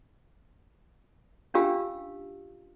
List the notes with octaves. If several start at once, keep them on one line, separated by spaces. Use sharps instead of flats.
C#4 D4 F4 G4 F5 E6